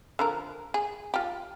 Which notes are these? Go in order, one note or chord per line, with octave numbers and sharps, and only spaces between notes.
D3 F3 A#4
G#4
F4 G4